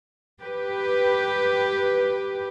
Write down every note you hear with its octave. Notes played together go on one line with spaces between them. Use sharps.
G4 B4